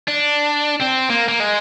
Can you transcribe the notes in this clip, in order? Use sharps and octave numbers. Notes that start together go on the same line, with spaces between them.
D4
C4
A#3
A#3
G#3